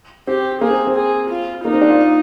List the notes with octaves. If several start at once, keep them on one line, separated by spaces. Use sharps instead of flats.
C4 G4
A#3 G#4
C4
C4
G#4
F4
A#3 D#4
C4
D4
F4